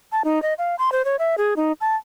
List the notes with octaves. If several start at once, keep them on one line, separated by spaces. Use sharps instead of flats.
A5
D#4
D#5
F5
C6
C5
C#5
E5
G#4
D#4
A5